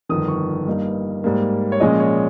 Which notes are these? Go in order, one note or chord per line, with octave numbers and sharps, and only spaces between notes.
G1 F2 D#3 D#6
C#6
G2 G3 A#3 D#4
G#2 G3 A#3
C#5
A#1 A#2 G#3 C#4 D#5
C#5